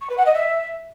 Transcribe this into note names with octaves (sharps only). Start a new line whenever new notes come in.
C#6
B4
F#5
D#5
E5